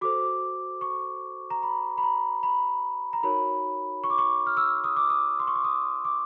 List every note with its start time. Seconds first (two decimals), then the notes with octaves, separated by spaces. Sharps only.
0.01 F#4 A4 C5 D6
0.81 C#6
1.50 A#5
1.63 B5
1.98 B5
2.03 A#5
2.43 B5
3.13 A#5
3.23 D#4 F#4 A#4 C#5 B5
4.04 C#6
4.10 D6
4.18 C#6
4.47 F6
4.57 E6
4.84 D#6
4.97 D6
5.10 D#6
5.40 C6
5.47 C#6
5.55 D6
5.64 D#6
6.05 D6